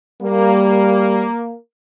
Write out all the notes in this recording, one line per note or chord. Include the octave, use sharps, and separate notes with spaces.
G3 A#3